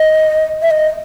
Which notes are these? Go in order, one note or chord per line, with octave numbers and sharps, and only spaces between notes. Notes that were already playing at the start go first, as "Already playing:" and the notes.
Already playing: D#5
E5
D#5